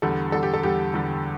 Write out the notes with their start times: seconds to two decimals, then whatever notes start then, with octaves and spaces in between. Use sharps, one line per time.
0.02 E2 D3 G3 A4
0.32 E2 D3 G3 A4
0.43 G4
0.54 A4
0.63 E2 D3 G3 G4
0.94 E2 D3 G3